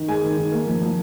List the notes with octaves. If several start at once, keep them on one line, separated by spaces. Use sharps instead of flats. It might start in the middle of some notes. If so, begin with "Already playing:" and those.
Already playing: D#3
G#3 G#5
D#3
D#3
A#3
F3
F3